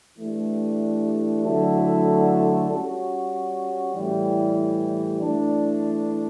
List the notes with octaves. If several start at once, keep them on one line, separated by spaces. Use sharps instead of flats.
E3 A3 D4 G4
D3 F#3 A3 E4 A4
G3 C#4 F#4
A2 E3 G3
E3 A3 D4